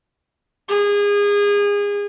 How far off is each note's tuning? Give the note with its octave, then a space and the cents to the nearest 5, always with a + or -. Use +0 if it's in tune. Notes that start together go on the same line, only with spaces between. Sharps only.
G#4 -30